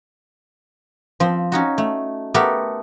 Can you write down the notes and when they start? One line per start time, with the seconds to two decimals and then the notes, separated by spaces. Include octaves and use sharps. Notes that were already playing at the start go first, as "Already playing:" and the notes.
1.20 F3 C4
1.52 C#4 D#4 F#4
1.78 A3
2.34 A3 B3 G4 A4 A#4